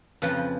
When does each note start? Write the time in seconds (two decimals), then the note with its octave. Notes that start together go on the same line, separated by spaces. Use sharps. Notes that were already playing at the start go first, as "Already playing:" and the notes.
0.22 F2 C#3 F3 B4